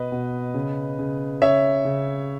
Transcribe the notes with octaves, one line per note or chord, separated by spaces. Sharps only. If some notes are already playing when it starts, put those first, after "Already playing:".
Already playing: B2 B4 D#5
B2
C#3
C#3
C#3 C#5 E5
C#3